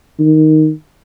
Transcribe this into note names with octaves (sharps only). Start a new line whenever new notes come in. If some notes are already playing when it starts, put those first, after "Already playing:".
D#3